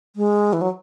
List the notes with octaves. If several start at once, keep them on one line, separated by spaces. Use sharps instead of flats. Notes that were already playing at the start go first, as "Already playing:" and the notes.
G#3
E3
F#3